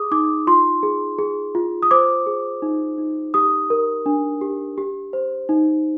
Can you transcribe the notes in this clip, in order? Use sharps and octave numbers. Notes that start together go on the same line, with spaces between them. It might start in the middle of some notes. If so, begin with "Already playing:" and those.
Already playing: G#4 D6 D#6
D#4 D6
F4 C6
G#4
G#4
F4
D#6
C5 D6
G#4
D#4
D#4
G4 D#6
A#4
D4
G4
G4
C5
D#4